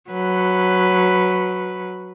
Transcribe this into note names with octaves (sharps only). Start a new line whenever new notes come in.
F#3 B4